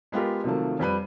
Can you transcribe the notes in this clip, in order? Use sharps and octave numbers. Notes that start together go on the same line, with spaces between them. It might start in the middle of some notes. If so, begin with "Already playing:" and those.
G#3 B3 F4 G4 A#4
C3 D#3 F3 F#3 A3 A#3
F2 G3 B4 D#7